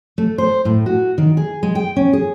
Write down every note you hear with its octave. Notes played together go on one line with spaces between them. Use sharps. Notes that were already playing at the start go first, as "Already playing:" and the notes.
A3
C5
A2
F#4
D#3
G#4
G#3
G5
C#4
G#4